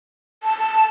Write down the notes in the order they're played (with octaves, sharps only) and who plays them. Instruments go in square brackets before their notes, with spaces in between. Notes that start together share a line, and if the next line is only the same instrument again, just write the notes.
[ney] A5